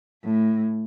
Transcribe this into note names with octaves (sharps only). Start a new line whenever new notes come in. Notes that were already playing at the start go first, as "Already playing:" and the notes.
A2